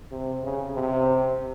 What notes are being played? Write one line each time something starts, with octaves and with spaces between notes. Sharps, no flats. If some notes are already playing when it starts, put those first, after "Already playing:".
C3
C#3
C3